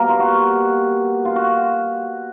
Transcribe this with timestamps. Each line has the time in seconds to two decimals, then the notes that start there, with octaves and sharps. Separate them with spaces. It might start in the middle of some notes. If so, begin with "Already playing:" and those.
Already playing: B2 G3 A#3 A#4
0.09 F4
0.20 F#4
1.25 F4
1.36 F#4